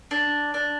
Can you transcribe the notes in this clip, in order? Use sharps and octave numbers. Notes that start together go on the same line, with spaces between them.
D4
D4